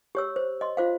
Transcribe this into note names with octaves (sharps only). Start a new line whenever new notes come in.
G4 C#5 E6
C5
D#5 C6
F4 C5 F5